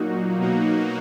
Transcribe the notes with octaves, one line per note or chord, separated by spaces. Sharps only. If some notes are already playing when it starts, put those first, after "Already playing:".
Already playing: A#2 F#3 A#3 D#4 F#4
B2 F#3 A#3 D#4 F#4